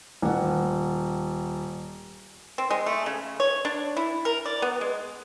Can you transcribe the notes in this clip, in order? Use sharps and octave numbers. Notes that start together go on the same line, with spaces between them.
D#1 F#5
C4
G#3
A3
C#3
C#5
D4
E4
A#4
D5
B3
G#3